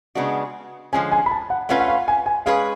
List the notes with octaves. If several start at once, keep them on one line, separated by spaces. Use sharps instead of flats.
C#3 G#3 B3 D4 F#4
D3 F3 G#3 C#4 G#5
G#5
B5
A5
F#5
A3 C#4 F4 B4 F#5
F#5
F5
G#5
G#5
G#3 C#4 G#4 B4 F5